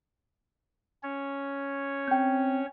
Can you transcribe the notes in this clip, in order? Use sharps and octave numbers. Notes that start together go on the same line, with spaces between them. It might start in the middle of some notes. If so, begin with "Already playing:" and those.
C#4 C#5
C4 G5 G6